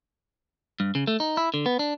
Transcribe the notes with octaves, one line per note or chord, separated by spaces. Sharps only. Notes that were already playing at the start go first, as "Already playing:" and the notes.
G2
C#3
A3
D#4
E4
D3
B3
D4